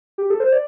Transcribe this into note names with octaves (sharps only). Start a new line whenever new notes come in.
G4
A4
C5
D5